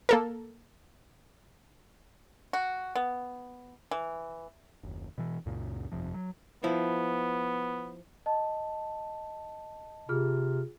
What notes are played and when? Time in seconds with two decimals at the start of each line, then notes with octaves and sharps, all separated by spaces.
0.09 A#3 A4 A#4
2.53 F#4
2.96 B3
3.91 E3
4.83 F#1 D#2
5.18 B2 E3
5.46 C#2 F#2 A#2 C#3
5.92 G1 F2 C3 F3
6.14 F#3
6.64 F3 B3 E4
8.26 D#5 A5
10.09 C3 F4 G#4 F6